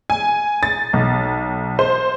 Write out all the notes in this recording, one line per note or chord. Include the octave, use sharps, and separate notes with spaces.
G#5
A6
B1
C5